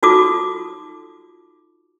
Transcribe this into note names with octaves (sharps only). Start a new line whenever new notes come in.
D#4 F4 F#4 A4 D6 D#6